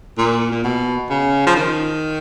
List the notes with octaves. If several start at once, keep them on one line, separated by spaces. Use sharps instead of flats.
A#2
A#2
B2
C#3
F3
D#3